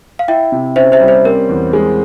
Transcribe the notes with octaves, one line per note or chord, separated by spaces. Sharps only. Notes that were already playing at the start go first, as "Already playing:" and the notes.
F5
E4 E5 G5
C3
C#4 C5 E5
C5 E5
G3
C5
C4 A#4
E2
G#3